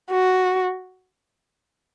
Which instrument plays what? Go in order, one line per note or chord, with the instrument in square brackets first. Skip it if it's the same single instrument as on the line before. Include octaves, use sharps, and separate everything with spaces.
[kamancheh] F#4